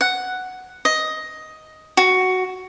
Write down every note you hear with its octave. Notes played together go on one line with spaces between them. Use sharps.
F#5
D#5
F#4